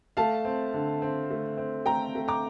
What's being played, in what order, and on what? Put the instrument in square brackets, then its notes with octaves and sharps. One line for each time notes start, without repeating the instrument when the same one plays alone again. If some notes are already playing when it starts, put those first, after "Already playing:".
[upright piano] A3 F5 A5
C4
D3
C4
A3
C4
A3 G5 A#5
A3
A#5 D6